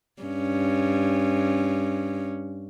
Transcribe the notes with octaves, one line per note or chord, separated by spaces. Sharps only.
G2 C#4